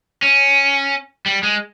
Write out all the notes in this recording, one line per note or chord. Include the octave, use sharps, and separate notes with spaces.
C#4
G3
G#3